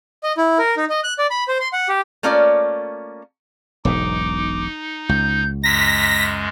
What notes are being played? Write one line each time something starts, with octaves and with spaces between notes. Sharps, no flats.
D#5
E4
A#4
D#4
D#5
F#6
D5
B5
C5
C6
F#5
G4
A3 A#3 C#4 F4 C#5 D5
E1 B1 G#2 D#4 D6
C#2 G6
F#2 G#3 A#5 A#6 B6